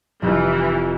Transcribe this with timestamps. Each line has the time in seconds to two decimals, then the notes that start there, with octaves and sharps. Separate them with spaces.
0.22 F1 E3 F6